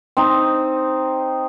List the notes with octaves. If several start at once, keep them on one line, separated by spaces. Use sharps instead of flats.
C4 D#4